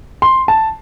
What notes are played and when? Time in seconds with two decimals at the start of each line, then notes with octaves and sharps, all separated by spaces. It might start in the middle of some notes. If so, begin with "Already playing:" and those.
0.22 C6
0.48 A5